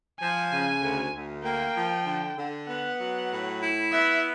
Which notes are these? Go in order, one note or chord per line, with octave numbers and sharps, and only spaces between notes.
F3 G#5
C#3
D2
D2
A#3 G5
F3
D3
D3
B3 F#5
F#3
A2
E4
B3 E5